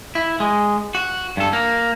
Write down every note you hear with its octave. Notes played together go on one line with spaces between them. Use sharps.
E4
G#3
F#4
G2 A4
A#3